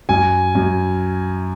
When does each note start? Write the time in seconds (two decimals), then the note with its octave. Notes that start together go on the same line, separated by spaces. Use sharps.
0.09 F#2 G#5
0.55 F#2